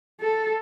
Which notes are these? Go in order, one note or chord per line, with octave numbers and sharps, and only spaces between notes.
A4